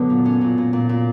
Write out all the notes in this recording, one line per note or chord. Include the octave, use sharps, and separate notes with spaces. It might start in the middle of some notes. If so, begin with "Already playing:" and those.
Already playing: F#2 D3 F#3 B3
A#2
C#4
A#2
A#2
A#2
A#2